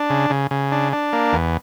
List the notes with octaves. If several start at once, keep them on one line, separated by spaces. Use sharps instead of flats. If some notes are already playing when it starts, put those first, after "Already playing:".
Already playing: D4
C#3
C#3
C#3
D4
D4
A#3
E2